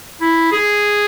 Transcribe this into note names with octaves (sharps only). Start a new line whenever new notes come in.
E4
G#4